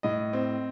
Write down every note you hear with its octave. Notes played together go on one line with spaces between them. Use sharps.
A2 D#5
C4